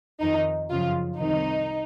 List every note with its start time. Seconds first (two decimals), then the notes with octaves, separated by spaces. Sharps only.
0.21 F2 D#3 D#4
0.70 F#2 C#3 F3 F4
1.19 C2 C3 D#3 D#4